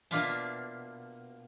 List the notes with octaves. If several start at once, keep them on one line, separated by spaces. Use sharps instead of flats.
B2 A#3 D4 F4 E5 A5